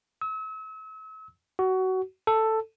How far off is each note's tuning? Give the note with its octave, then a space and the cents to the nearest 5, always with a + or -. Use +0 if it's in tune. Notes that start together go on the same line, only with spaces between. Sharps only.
E6 -40
F#4 +20
A4 +5